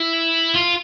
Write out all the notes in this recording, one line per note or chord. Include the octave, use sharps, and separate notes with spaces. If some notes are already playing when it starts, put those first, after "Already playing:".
Already playing: E4
F4